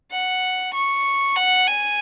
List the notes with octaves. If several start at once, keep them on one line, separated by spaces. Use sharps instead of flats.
F#5
C#6
F#5
G#5